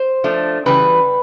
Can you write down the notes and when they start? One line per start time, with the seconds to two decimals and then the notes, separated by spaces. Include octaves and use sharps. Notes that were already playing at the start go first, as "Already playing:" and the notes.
Already playing: C5
0.24 F3 A3 D4
0.66 C#3 E3 G3 B4